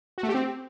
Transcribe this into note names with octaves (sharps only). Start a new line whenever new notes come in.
F#4
A3
G4
C4